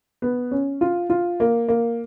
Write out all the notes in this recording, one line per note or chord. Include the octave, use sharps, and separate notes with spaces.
B3
C#4
F4
F4
A#3
A#3